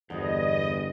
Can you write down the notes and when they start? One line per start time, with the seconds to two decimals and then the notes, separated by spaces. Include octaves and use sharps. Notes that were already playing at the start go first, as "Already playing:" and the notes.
0.10 G1 E2 D3 C4 D#5